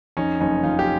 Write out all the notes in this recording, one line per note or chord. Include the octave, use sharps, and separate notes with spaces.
F2 C#4 D#4
F#1 C#4 D#4
F2 D#4 F4
G4